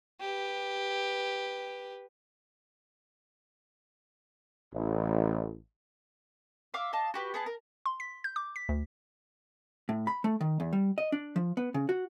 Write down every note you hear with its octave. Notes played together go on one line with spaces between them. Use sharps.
G4 B4
A1
E5 F5 D6
D#5 F5 A5
F#4 G4 B4
B3 G#4 A5
A#4
C6
B6
G6
D6
B6
D2
A2
B5
A3
D#3
E2
G3
D#5
D4
F3
B3
C#3
F#4